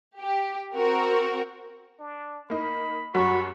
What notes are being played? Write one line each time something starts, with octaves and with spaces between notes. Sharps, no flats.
G4
C4 F#4 A#4
D4
A#3 D#4 B5
F#2 F#3 G3 F#4 B5 C#6